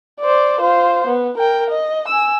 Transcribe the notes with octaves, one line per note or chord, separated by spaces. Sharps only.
C5 D5
F4 C5
B3
A#4 G5
D#5
G#5 E6